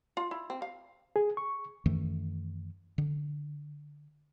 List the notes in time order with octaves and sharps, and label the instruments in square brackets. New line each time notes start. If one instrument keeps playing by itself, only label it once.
[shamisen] F4
E4
C4
F5
[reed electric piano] G#4
C#6
[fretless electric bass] F#2 D#3 E3 A3
D3